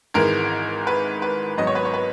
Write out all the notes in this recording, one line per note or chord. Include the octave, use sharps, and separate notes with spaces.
G#1 G#2 E3 G#3 A#4
B4
B4
G#1 G#2 F#3 B3 D#5
C#5
B4
C#5
B4